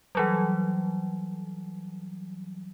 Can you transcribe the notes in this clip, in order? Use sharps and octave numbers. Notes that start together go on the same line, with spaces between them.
E3 F#3 G3